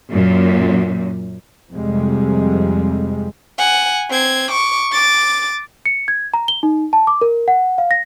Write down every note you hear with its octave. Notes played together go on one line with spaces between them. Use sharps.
F#2 A#2
F2 C3 G3 G#3
F#5 G#5
C4 G#6
C#6 D6
D6 A6
C#7
G#6
A#5
G7
D#4
A5
D6
A#4
F#5
F5
A#6